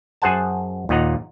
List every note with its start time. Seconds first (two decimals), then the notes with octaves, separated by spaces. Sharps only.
0.22 F#2 G#4 C5 F#5 G#5 A5
0.89 D#2 A#2 D#5 F#5 A#5